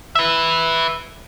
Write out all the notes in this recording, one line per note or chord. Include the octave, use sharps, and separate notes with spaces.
B4 E5